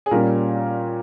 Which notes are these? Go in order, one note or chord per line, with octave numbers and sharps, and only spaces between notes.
G#4
A#2 G3 C#4 A#4